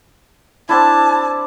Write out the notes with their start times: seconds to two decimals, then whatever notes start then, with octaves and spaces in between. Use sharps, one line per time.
0.69 C4 D4 E4 A5